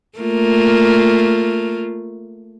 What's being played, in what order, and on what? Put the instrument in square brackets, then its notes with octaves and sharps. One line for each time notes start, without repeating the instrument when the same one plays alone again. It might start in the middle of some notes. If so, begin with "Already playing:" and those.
[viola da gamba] A3 A#3 F4